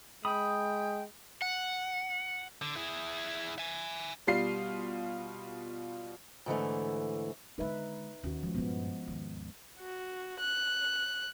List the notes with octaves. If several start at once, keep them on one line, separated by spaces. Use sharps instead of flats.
G#3 G5 B5 D#6
F#5
D3
E4 G#4
E5 G#5
B2 G3 F4 C7
G#2 D3 E3 A3
D3 G#3 D#4 B4 E5
D#2 C#4 F#4
F3 G#3
G2 A#2 G#3 B3
D#2 G#2
F#4
F#6